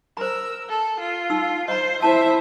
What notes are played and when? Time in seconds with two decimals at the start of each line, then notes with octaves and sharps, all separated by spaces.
0.17 A#4 C5 A#5 E6
0.69 A4
1.00 F4
1.30 D#4 E6
1.68 C5 D#5 A#5
2.02 E4 C5 E5 A5